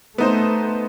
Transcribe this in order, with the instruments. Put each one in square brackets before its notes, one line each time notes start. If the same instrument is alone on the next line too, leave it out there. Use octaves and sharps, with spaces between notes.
[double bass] A3 [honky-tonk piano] B3 D#4 C5